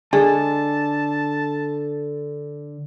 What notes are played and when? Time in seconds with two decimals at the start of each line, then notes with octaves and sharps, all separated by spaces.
0.13 D3 G#3 A5